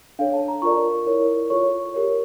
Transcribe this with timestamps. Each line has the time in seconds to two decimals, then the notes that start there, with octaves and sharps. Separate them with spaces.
0.19 D4 A4 C#5 F5
0.33 A5
0.48 A#5
0.62 F4 A#4 D5 C#6
1.06 E4 A#4 C#5
1.50 F4 A4 C#5 C#6
1.94 G4 A#4 C#5